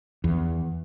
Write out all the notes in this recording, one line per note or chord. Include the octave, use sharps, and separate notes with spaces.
E2